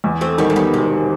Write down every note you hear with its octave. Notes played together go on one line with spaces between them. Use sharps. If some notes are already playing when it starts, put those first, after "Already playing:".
E2
A3 C4
D#3 G3 B3
A3
G3 B3
E1 C3